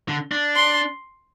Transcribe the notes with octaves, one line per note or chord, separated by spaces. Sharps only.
D3
D4
C6